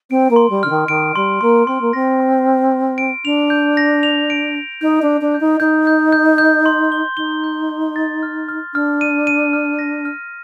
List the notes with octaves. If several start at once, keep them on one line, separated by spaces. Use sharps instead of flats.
C4 D7
A#3
C6
G3
D3 F6
D#3
D#3 D7
G3 C6
A#3 C6
C4 C6
A#3
C4 A#6
C6
F6
C6
D7
D4 F7
G6
A#6
F7
D7
A#6
D#4 G6
D4
G6
D4
G6
D#4
D#4 G6
G6
G6
G6
C6
G7
D#4 G7
G6
G6
A6
F6
F6
D4 F6
D#7
D#7
F6
A#6
F6